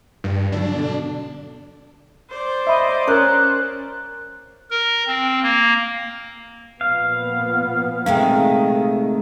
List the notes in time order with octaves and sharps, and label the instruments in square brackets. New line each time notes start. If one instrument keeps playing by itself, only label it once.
[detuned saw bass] G2
[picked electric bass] G2 D3 F#3 [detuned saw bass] D4
[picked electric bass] B2 D3
[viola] C5 D5
[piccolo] D#5 [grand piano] E5 B5
[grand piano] C#4 C#5 [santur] A#4 [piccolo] F#6
[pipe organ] A#4
C4
A#3
[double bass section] A#2 F3 B3 [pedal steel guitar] F5
[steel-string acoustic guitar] C3 G#3 A3 [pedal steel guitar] D#3 [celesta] F5 G5